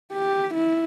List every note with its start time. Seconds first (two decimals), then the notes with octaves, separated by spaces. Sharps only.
0.12 G4
0.54 E4